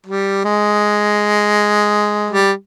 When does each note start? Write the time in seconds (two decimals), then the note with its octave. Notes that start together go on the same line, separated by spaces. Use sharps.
0.06 G3
0.44 G#3
2.30 G3